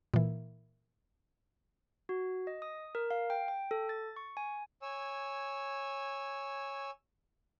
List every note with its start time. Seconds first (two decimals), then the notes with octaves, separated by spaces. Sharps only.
0.14 A#2 E3
2.09 F#4
2.47 D#5
2.62 D#6
2.95 A#4
3.11 F5
3.30 G5
3.48 G5
3.71 A4
3.89 A6
4.16 C#6
4.37 G#5
4.82 C#5 G#5 E6